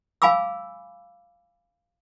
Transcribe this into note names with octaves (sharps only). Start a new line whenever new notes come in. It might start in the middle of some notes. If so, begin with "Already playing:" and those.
F5 G#5 B5 D6 E6